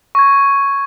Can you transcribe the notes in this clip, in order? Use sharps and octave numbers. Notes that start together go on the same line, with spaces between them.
C#6 G#6